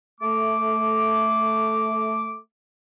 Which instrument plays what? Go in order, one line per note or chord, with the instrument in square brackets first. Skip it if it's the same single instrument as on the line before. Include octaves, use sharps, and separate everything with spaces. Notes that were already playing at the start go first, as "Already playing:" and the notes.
[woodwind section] A3 D6